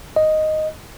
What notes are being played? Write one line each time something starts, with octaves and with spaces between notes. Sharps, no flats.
D#5